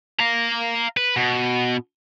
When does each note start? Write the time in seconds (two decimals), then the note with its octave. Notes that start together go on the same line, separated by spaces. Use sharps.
0.20 F5 A#5
0.97 B4
1.16 B2